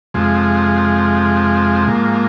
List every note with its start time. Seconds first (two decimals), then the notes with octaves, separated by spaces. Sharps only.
0.14 F2 C3 F3 G#3
1.87 G#2 F3 A#3